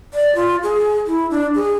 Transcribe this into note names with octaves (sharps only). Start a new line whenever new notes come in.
D5
F4
G#4
E4
D4
G#4